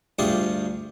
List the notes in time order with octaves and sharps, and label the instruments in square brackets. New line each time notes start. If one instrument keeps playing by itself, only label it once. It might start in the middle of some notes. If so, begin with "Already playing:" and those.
[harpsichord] D2 G2 A3 F4 G4 G#4